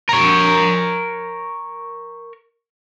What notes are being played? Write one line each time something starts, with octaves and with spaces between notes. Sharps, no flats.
A#4 C#5